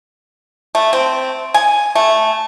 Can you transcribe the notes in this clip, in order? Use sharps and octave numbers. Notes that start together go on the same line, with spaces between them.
A3
C4
G#5
A3